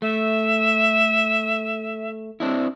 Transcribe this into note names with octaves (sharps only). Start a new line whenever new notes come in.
A3 E5
C4 D4 E4